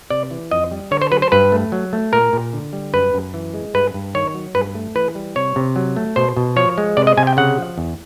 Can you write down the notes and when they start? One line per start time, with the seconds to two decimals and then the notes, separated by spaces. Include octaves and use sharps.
0.10 C3 D5
0.31 E3
0.51 F2 D#5
0.71 G3
0.91 D3 C#5
1.02 C5
1.11 F#3 B4
1.22 C5
1.32 G2 B4
1.52 A3
1.72 F#3
1.93 A3
2.13 A#2 A#4
2.33 A#2
2.53 D3
2.73 G3
2.93 F#2 B4
3.14 F#2
3.34 E3
3.54 G#3
3.74 G2 B4
3.94 G2
4.15 D#3 C#5
4.34 F#3
4.55 G2 B4
4.75 A3
4.95 E3 B4
5.15 G3
5.36 C3 C#5
5.56 C3
5.76 F#3
5.96 A3
6.16 B2 C5
6.37 B2
6.56 F3 C#5
6.78 G#3
6.97 C3 D5
7.07 D#5
7.17 C3 G#5
7.27 G5
7.37 C#3 F#5
7.58 F3
7.78 E2